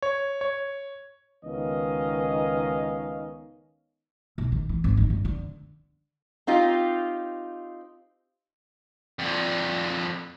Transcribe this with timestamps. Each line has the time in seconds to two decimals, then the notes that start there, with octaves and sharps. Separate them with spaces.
0.02 C#5
0.41 C#5
1.45 C#2 D#3 B3 C#4 D#5 F5
4.38 B1
4.52 D#3
4.69 E3
4.84 G#1
4.97 D#3
5.10 G2
5.25 D3
6.47 C4 D#4 F4 G4
9.19 F2 D3